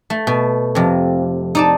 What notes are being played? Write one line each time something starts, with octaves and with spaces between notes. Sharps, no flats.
A3
B2
F2 C3
D#4 D5 A5